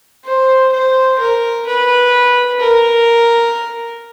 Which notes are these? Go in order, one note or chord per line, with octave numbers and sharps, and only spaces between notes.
C5
C5
A#4
B4
A#4